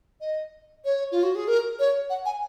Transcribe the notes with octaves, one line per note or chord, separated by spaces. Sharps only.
D#5
C#5
F4
F#4
G#4
A#4
C#5
F#5
G#5